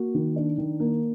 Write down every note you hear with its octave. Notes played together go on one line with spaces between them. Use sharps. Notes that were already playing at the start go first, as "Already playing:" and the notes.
Already playing: A#3 F#4
D#3
D4
D#3
A#3